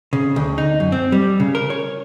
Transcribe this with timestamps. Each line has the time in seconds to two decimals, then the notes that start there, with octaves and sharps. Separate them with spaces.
0.13 C#3
0.36 D2
0.58 D#4
0.80 F#2
0.92 C4
1.12 G3
1.40 C#3
1.55 A#4
1.70 C#5